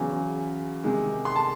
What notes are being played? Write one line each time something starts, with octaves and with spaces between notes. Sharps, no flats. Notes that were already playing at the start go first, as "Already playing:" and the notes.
Already playing: E2 C#3 F#3
C3 D#3 G#3
C6
A5